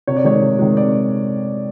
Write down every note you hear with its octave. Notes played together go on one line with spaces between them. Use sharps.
C3 C#5
D5
D#3 G#3 C#5
C3
D#3 G#3
C3 D5